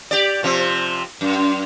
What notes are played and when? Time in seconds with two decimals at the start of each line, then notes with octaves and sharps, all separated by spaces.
0.11 G4 D5
0.43 C3 F3 C4
1.21 F#2